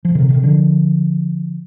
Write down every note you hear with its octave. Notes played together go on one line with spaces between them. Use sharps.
F3
C3 D#3
C3 D#3
D3 F3